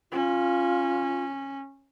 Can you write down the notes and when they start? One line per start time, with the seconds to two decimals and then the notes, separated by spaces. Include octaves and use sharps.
0.12 C#4 F4